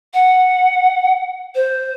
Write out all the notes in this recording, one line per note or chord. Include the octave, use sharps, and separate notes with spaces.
F#5
C5